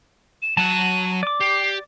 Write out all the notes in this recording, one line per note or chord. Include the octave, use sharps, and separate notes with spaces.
E7
F#3 F#5 A5 D#7
D5 D6
G4 C7